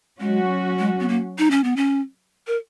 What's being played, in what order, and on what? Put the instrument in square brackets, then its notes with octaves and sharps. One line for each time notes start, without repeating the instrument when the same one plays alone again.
[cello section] F#3 C#4 F#4 [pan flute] G#3
[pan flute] G#3
B3
A#3
D#4
C#4
B3
C#4
A#4